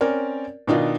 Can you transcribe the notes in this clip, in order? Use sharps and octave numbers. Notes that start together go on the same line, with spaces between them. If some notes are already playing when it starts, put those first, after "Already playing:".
C4 C#4 A#4 D5
B2 D#3 D4 D#4 F4